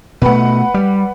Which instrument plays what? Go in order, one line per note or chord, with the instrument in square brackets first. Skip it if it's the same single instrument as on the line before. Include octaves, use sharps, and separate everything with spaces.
[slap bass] B2 A3 [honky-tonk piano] B4 F#5
[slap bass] G3